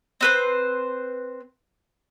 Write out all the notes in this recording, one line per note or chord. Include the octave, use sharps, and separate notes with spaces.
C4 B4 C5